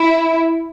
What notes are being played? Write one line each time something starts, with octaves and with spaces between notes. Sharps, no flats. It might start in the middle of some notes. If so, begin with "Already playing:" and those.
Already playing: E4